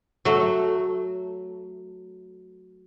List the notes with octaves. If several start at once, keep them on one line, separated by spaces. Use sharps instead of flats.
F#3 A3